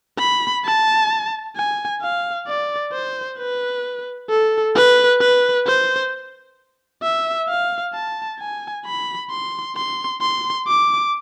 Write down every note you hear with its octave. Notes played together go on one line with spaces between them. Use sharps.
B5
A5
G#5
F5
D5
C5
B4
A4
B4
B4
C5
E5
F5
A5
G#5
B5
C6
C6
C6
D6